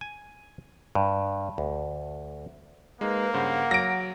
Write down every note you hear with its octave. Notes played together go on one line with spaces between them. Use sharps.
G#5
G2
D2
G#3 A#3 D#4 B4
G2 C#3 C5 F#5
F#3 A#6 D7